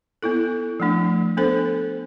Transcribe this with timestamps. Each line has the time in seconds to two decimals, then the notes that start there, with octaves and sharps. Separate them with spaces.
0.22 B3 E4 A4
0.80 F3 A3 D4
1.37 B3 D4 A4 C5